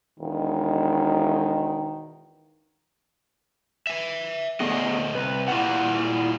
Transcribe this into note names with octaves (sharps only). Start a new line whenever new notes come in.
E1 D#3
E5 G#5
D2 A3 B3 G#4 D#5
C2 B4
A#2 G3 E4 F#5